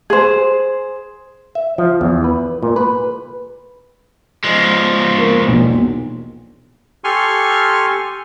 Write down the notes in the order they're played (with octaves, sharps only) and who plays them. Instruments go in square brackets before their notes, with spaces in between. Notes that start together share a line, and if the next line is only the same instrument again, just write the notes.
[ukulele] G#4 C5
[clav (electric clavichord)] E5
F3
E2
B4
A#2
B4
[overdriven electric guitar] F3 G#3
[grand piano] A#3
E1 B1 A#2
[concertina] G4 A4 G#5 C6 C#6 F6